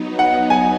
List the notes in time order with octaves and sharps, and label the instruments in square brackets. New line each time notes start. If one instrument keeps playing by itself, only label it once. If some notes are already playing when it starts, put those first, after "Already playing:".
Already playing: [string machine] F#3 B3 D#4
[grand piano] F#5
G#5